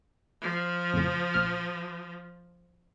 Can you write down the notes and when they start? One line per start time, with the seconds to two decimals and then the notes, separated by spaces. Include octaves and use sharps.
0.42 F3
0.93 F2 A2 C#3
1.34 A#1 F6